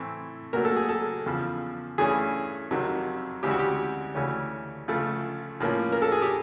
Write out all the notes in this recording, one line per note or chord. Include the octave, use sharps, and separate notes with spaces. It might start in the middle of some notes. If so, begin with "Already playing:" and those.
Already playing: A2 E3 A3 C4
A#2 F#3 A3 A#4
A4
G#4
A4
E2 C#3 F3
G2 E3 A3 C#4 G#4
F2 C3 D#3 F#3
D2 C#3 E3 G#3 C4 G4
F#4
G4
D2 C#3 E3 A3 C#4
C#2 C#3 F3 A3
A2 F3 A#3 C#4
A#4
A4
G#4
G4